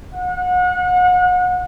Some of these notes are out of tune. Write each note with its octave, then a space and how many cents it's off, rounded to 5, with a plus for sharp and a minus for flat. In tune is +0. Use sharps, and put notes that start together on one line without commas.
F#5 -35